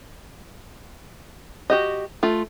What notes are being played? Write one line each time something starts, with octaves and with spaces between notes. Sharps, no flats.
F#4 G4 D#5
A3 F4